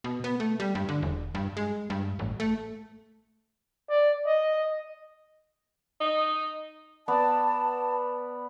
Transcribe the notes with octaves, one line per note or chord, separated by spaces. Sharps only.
B2
B3
A3
G3
G2
D3
E1
G2
G#3
G2
A1
A3
D5
D#5
D#4
B3 D5 A5